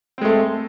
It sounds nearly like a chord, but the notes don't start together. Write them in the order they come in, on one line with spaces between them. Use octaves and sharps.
C4 G#3 A3